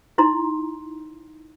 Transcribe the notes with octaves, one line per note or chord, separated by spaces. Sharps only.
D#4 E4 A#5 C6